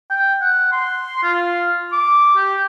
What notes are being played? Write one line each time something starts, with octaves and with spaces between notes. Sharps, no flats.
G5
F#5
C6
F4
D6
G4